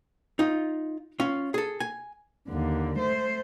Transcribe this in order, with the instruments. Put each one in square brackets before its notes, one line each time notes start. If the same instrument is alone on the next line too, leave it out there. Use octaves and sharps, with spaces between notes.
[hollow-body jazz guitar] D#4 F4
C#4 F4
G#4 A4
G#5
[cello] D#2 D3
A3 C5